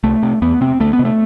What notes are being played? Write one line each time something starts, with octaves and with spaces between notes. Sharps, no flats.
C2 A3
C3
E2 B3
C3 C4
D2 A3
B3
C3
A3